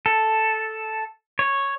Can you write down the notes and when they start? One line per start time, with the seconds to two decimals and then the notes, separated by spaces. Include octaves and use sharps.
0.06 A4
1.39 C#5